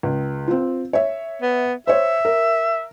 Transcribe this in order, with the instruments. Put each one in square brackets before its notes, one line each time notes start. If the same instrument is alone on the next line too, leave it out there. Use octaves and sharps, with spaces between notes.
[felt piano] C#2
C4 F4
C#5 E5
[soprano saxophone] B3
[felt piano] C5 C#5 [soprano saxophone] E5
[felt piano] A#4